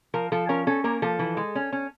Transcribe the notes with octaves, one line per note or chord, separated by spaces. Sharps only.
F3 A#4
F3 A4
C#4 A#4
C#4 A4
A#3 A#4
F3 A4
E3
G#3
C#4
C#4